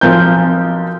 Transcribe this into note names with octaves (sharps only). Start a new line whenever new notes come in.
B1 F3 C4 A#4 G6